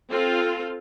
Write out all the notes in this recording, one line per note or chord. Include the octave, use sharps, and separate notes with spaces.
C4 F4 A4